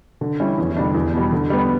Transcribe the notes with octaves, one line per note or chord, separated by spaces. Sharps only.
D3
G3 C#4 E4
E2
D3 G3 D4
E2
B2 G3
D3
G3 B3